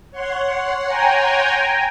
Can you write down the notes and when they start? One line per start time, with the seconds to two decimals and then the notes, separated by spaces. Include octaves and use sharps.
0.11 C#5 F#5 C6
0.89 G5 G#5 A#5